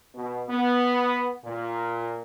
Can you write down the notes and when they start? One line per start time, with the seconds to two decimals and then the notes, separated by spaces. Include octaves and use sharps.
0.15 B2
0.48 B3
1.45 A#2